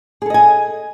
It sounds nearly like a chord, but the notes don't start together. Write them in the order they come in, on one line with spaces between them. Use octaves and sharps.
G#4 A4 D#5 G#5